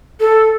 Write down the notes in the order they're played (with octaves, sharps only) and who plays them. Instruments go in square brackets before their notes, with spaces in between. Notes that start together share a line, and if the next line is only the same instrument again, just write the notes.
[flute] A4